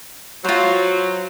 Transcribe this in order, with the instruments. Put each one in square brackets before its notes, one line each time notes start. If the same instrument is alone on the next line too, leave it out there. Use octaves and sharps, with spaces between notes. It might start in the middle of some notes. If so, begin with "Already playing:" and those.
[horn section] F#3 [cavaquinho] F4 C5